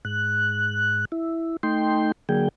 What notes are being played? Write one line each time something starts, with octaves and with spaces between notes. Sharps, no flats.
G#2 F#6
E4
A3 D#4 G5 C6
D3 F#3 A#3 G#4 G5